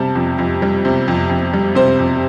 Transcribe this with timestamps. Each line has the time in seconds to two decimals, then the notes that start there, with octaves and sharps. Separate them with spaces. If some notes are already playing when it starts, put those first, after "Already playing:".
Already playing: C3 G3 A5
0.15 F2
0.39 F2
0.62 G3
0.85 C3
1.08 F2
1.29 F2
1.53 G3
1.75 C3 C5
1.99 F2